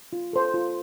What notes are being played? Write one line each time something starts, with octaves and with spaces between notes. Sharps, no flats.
F4
A4 C5
F4